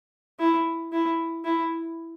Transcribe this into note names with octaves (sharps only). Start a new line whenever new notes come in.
E4
E4
E4